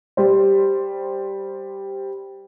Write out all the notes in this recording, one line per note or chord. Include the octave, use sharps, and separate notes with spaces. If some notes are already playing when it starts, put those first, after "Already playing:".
G3 C5